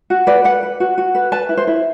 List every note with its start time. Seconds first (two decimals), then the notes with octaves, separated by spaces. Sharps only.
0.10 F#4
0.27 B4 D5
0.44 B4 F#5
0.63 B4
0.80 F#4
0.98 F#4
1.15 B4
1.32 B4 A5
1.49 E4
1.57 C5
1.67 E4